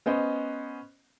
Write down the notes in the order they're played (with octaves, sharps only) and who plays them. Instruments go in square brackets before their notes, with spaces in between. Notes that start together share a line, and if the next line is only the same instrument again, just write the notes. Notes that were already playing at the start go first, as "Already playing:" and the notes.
[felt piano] B3 C#4 C5 D#5